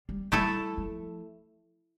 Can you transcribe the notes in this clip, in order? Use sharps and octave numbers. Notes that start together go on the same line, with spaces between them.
G3
G3 A3 E4 A4
F3